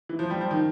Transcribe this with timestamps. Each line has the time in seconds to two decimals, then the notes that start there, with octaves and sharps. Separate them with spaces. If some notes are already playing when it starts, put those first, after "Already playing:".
0.09 E3
0.19 F3
0.30 G3
0.41 F3
0.51 D#3